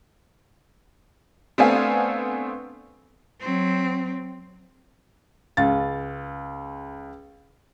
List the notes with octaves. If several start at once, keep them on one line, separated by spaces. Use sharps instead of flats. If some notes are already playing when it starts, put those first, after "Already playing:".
A3 B3 C4 D4 F5 G#5
F#3 C4
C#2 F5 A6